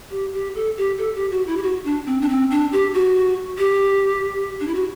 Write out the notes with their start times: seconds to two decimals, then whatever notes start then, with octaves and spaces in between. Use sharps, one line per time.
0.11 G4
0.33 G4
0.55 A4
0.77 G4
0.98 A4
1.15 G4
1.31 F#4
1.47 E4
1.57 G4
1.63 F#4
1.84 D4
2.06 C4
2.21 D4
2.29 C4
2.50 D4
2.72 G4
2.94 F#4
3.58 G4
4.60 D4
4.67 E4
4.75 F#4